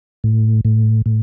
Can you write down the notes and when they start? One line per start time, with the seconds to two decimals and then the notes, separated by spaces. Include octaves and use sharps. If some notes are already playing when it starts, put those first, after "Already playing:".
0.24 A2
0.65 A2
1.06 A2